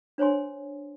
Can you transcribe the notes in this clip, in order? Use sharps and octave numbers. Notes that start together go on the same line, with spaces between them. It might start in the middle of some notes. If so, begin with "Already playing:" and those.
D4 C5 C#5 G#5 C6